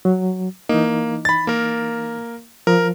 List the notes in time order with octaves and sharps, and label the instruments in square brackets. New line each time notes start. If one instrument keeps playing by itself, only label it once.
[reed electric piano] F#3
[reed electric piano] E3 D#4 [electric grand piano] A#3
[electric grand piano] B5 A6
A#3 A#4
[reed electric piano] F3 [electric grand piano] A#4